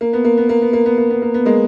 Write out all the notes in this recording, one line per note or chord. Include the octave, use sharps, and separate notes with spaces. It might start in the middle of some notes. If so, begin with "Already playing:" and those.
A#3
B3
A#3
B3
A#3
B3
A#3
B3
A#3
B3
A#3
B3
G#3 A#3